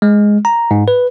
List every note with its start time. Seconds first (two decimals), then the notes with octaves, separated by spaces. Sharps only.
0.02 G#3
0.45 A#5
0.71 G#2
0.88 B4